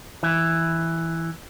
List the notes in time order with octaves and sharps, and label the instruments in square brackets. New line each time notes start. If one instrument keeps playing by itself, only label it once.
[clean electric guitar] E3